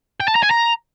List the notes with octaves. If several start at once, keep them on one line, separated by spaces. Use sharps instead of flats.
G5
A5
A#5
G#5
A#5